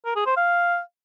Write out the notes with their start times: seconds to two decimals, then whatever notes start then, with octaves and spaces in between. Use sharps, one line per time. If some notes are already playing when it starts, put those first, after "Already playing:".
0.05 A#4
0.16 G#4
0.26 C5
0.37 F5